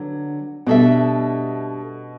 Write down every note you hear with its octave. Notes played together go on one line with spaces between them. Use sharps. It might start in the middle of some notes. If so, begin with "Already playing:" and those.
Already playing: D3 F#3 B3
B2 G3 D4 A4 E5